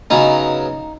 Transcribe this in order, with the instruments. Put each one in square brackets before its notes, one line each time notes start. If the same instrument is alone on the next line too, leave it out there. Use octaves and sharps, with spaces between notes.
[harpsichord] C#3 F#3 B3 [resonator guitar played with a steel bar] D#4